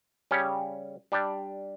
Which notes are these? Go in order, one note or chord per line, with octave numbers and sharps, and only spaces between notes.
C#3 G3 C#4 G4 C#5
G3 D4 G4 D5